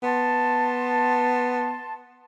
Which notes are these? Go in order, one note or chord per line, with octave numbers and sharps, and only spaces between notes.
B3 A5 C6